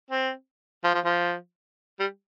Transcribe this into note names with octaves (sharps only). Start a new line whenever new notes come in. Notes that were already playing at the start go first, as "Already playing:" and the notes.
C4
F3
F3
F3
G3